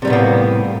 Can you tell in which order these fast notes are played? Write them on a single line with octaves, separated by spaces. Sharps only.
C3 G3 A2 B3 A#3